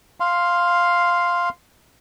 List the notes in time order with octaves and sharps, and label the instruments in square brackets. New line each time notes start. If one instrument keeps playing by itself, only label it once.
[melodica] F5 C6